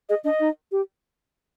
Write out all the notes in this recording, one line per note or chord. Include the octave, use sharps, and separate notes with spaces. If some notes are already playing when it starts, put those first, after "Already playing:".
G#4 D#5
D4 D#5
D#4
G4